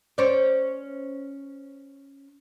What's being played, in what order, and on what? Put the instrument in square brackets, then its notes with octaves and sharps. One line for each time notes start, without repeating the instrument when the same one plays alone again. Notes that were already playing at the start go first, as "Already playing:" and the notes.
[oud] C#4 C5 D5